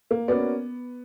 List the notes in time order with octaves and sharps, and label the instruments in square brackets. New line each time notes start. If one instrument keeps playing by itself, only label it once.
[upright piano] A#3
[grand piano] A#3 C#4 F#4 A#4 D5 [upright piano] B3